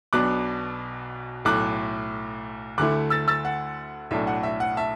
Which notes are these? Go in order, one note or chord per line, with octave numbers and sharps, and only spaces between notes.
B1 B2 B3 D4 D6 F#6
B1 A2 A3 D6 F#6
D2 D3 A3 E4 D6 F#6
E6 A6
E6 A6
F#5
B1 A2 A3 D4 E5
F#5
E5
F#5
E5 A5